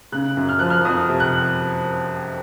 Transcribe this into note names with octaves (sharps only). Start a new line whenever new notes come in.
C#3 F#6
F#2
F6
F3 F#6
F6
F2 D#6
C3
F#6